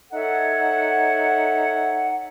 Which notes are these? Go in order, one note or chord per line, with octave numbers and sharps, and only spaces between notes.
D#4 A4 C#5 E5 F#5